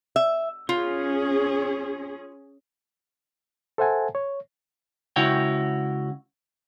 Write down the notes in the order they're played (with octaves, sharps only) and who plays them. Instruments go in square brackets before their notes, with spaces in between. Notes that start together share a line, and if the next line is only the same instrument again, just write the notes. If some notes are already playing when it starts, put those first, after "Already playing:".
[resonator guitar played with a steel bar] E5
[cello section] C#4 G#4 [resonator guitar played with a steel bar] F4
[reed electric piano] A4 C5 E5 F#5 G#5 A5
C#5
[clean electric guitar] C#2 C#3 E4 F#4 C#5 G5